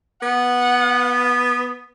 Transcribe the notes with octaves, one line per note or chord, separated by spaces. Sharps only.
B3 F#5